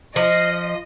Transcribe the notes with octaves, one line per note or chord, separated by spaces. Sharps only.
F3 D#5